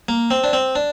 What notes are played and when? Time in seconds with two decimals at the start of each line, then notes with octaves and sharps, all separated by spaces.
0.09 A#3
0.31 C4
0.44 D4
0.53 C4
0.75 D4